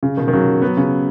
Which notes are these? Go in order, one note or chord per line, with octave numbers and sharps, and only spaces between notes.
C#3
B2 D#3
D#3
C#3 F#3
F#3 B3
C#3